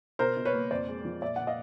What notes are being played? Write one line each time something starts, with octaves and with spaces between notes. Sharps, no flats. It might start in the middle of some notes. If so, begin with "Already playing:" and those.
B2 A#4 C5
B2
B4 C#5
A#3
F2 C5 D5
G#3
F3
A#2 D5 E5
A#2 F#5
D#5 F5